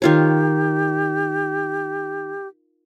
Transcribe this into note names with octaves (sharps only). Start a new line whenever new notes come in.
D#3 F4 G4 C#5